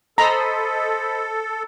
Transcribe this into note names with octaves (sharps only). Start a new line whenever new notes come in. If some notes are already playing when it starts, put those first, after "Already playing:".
A4 C5 D#5 A#5 B5